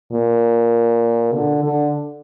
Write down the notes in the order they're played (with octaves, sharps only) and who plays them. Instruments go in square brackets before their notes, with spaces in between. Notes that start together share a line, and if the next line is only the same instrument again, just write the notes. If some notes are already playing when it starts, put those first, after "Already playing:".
[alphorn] A#2
D3
D3